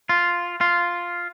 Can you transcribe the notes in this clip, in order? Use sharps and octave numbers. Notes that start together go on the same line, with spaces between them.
F4
F4